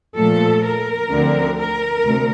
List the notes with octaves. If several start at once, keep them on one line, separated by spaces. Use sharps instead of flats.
A#2 F3 A3 A4
A#4
D2 D3 F3 C4
A#4
D2 C3